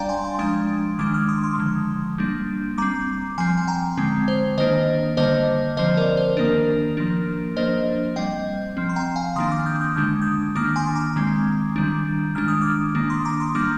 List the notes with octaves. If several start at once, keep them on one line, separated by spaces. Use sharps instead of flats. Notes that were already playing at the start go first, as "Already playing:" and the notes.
Already playing: G3 D4 D5 F5 G5 A#5
G#5 C6
G#5 C6
F3 G#3 D4 C6 D#6
D#3 G#3 D4 D6 F6
D6 F6
C6 D#6
C6 D#6
D3 F3 G#3
G3 A#3 D4
G3 C4 A#5 D6
F3 C4 G#5 C6
G#5
G5 A#5
D3 G#3 C4
C5
D#3 A#3 D4 C5 D#5
D3 G3 A#3 C5 D#5
D3 F3 C4 C5 D#5
A#4 D5
C5
D#3 A#3 D4 A#4
F3 A#3 D4
F3 A#3 D4 C5 D#5
G3 C4 D#5 G5
F3 C4
C6
G5 A#5
F5 G#5
D#3 A#3 D4 C6 D#6
D6 F6
D#6 G6
D#6 G6
D3 G#3 D4 G6
D#6 G6
D#3 A#3 D4 D6 F6
G#5 C6
A#5 D6
D#3 G#3 C4
D#3 G3 D4
D#3 G#3 D4 F6
D#6
D6 F6
D#3 A#3 D4
C6 D#6
A#5 D6
C6 D#6
G3 A#3 D4 D6 F6